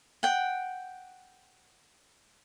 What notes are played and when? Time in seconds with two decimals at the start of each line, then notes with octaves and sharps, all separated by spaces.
0.23 F#5 G5